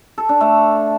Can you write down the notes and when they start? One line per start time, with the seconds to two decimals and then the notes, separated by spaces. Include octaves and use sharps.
0.18 A4
0.29 D4
0.41 A3